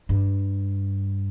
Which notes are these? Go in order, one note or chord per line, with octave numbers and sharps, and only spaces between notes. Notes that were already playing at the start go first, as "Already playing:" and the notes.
G2